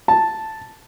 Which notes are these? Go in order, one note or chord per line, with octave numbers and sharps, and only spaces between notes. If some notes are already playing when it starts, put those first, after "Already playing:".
A5